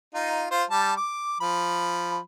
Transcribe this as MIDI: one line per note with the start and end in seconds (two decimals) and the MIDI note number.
0.14 0.46 63
0.14 0.46 65
0.51 0.64 65
0.51 0.64 72
0.70 0.92 55
0.70 0.92 81
0.97 1.40 86
1.41 2.18 53
1.41 2.18 83